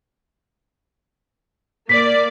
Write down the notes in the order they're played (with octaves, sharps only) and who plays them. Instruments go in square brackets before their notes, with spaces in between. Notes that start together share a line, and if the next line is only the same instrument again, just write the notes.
[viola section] A#3 D5 [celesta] B6